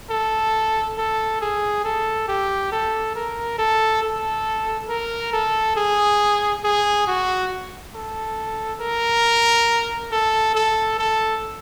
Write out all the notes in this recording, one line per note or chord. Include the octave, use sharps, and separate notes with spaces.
A4
A4
G#4
A4
G4
A4
A#4
A4
A4
A#4
A4
G#4
G#4
F#4
A4
A#4
A4
A4
A4